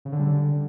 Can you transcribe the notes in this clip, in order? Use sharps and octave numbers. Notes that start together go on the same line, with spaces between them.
C#3
D3
G3
D3